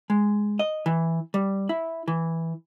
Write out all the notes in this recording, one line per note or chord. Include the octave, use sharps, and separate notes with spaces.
G#3
D#5
E3
G3
E4
E3